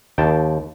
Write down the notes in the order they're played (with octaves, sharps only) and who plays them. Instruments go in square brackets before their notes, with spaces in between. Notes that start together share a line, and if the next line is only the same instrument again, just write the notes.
[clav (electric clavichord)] D#2 G5 A5